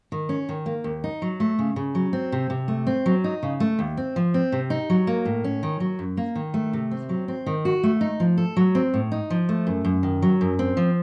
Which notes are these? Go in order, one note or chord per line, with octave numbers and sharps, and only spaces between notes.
D#3
C#4
D#3
A#3
D#2
D#4
F#3
A3
C#3
C#3
F#3
C4
C3
C3
A3
C4
F#3
D#4
C#3
A3
D#2
C4
F3
C4
C3
D#4
F#3
A#3
A2
C#4
D#3
F#3
F#2
A#3
D#3
A3
C3
C4
F#3
C4
D#3
F#4
A3
D#4
F3
A4
F#3
C4
A2
D#4
F3
A3
F#2
F#2
D#3
F#3
F#2
C4
F3